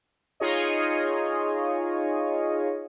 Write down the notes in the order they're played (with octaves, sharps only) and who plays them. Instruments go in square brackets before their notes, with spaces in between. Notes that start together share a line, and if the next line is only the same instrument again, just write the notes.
[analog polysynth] D#4 F4 G#4 C#5 D#5